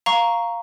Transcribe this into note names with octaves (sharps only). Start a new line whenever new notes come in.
F5 A#5 C#6